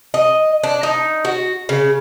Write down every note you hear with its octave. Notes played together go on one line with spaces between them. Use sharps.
D#5
D4
D#4
F#4
C#3